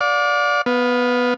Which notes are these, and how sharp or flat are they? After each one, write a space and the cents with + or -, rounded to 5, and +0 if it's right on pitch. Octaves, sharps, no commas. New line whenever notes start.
D5 -10 F5 +45
B3 +0 F5 +30